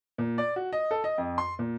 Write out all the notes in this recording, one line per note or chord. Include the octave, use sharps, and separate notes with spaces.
A#2
D5
F#4
D#5
A4
D#5
F2
C6
A#2